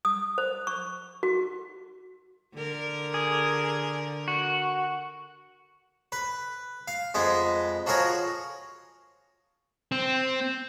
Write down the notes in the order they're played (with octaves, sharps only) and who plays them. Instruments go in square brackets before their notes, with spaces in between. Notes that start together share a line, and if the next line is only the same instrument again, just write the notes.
[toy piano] D#6
C5
C#6
F#4
[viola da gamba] D3 A#4
[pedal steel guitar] G#4
F#4
[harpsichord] B4
F5
F2 G#3 B3
F3 F#4 G#4 A#4 C#5
[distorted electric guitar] C4